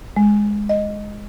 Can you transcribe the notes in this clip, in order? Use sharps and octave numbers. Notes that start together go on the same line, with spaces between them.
G#3
D#5